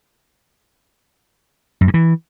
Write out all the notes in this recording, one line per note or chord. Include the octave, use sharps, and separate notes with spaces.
F#2
G2
E3